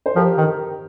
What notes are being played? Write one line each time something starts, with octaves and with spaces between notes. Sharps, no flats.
C5
F3 G4 A#4
D#3
A#4